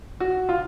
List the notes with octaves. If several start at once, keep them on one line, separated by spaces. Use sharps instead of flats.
F#4
F4